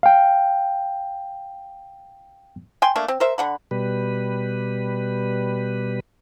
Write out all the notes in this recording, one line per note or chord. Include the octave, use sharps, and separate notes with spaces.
F5 G5
G5 G#5 C6
A3 A#3 D4
C4
A#4 C5 E5
D3 F#5 B5
B2 G3 B4